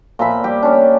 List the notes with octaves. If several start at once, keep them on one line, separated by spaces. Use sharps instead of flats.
A#2 F3 E5 B5
G3 G4
C#4 D4